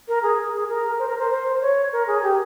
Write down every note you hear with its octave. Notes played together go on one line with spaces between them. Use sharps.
A#4
G#4
G#4
A#4
C5
A#4
C5
C5
C#5
A#4
G#4
G4